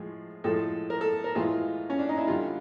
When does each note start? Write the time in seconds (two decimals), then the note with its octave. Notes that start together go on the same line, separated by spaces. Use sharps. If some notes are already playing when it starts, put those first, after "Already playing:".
Already playing: A2 F3 G#3
0.44 A2 F3 G#3 A4
0.90 A#4
1.01 A4
1.24 A#4
1.35 A2 E3 G#3 F4
1.90 C#4
1.99 D4
2.09 D#4
2.18 E4
2.27 D3 G3 F4